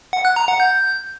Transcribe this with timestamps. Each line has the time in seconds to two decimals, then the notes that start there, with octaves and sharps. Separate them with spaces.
0.13 F#5
0.25 F#6
0.36 A#5
0.48 F#5
0.60 G6